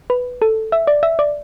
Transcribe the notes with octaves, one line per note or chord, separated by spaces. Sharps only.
B4
A4
E5
D5
E5
D5